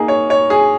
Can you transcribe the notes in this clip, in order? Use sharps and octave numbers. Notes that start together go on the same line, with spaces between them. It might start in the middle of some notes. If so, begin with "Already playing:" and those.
Already playing: A#3 D#4 G#4
C#5
C#5
G#4